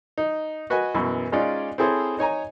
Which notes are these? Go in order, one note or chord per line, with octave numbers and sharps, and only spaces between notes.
D#4
F#4 B4 D#5 G#5
F#2 B2 E3
G#3 C#4 D#4 F4 D5
C4 E4 G#4 A4 C5 C#5
D#4 C#5 G#5 A#5